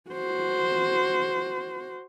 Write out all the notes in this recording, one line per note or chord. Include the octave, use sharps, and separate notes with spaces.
F#4 C5